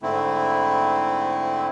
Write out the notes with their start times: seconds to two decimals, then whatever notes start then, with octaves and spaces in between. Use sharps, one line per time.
0.02 G#2 D3 A3 C4 E4